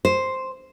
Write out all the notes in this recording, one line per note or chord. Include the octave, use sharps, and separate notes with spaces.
C5